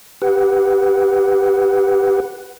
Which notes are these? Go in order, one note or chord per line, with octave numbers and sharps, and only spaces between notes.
G4 B4 F#5